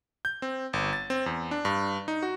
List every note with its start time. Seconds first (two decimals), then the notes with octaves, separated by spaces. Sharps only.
0.25 G6
0.42 C4
0.73 G1
0.93 A6
1.10 C4
1.26 E2
1.51 D4
1.65 G2
2.08 D#4
2.23 F#4